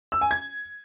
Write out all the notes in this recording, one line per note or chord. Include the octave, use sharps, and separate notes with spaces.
E6
G#5
G#6